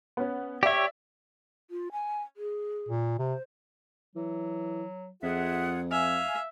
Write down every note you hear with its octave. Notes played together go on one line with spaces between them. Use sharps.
B3 C#4
G4 C#5 D5 E5
F4
G#5
G#4
A#2
C3 C5
E3 F#3
F2 F4 G#4 E5 F#5
E5 F5 G#5 F6